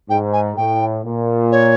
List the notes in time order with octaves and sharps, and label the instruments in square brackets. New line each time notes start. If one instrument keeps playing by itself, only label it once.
[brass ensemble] G#2 [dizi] G5
[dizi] G#5
[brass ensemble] A2 [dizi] G5
[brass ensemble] A#2
[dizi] C#5